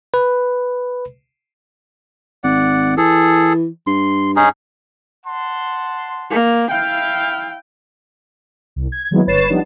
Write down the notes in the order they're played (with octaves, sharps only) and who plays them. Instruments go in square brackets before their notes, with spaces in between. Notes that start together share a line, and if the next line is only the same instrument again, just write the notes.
[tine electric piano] B4
[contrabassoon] G#1 [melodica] D5 F#5
[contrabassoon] E3 [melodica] G#4 A4
[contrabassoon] G2 [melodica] C6
[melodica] C#4 D#4 G#4
[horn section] F#5 A5 C6
[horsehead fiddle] A#3
[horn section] E4 F5 [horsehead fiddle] G5
[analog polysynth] C2
G#6
D#3 F#3 G#3 A#3 B3 E4
G1 B4 C#5 A6 C7 E7
F3 G3 B3 D4 D#4